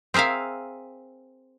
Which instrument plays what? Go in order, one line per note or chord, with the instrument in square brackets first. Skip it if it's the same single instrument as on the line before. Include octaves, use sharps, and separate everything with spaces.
[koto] C4 G#4 A#4 E5 F5